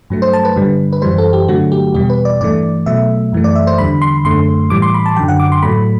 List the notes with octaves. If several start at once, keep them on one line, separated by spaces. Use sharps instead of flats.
G2 F#3 A3
C5
A5
B4
G2 D3 G3
B4
F#2 E3 G3 C5
A4
G4
G2 D3 F#3 A3 F#4
G4
E2 B2 G3 G4
B4
D5
G2 E3 A3 D5
B2 F#3 A3 E5
F#2 E3 A3
D5
E5
C5
E2 D3 G3 B5
C6
F#2 D3 A3 C6
A2 E3 G3 D6
C6
B5
A5
F#2 D3 F#3 G5
F#5
D6
C6
A2 F#3 A3 B5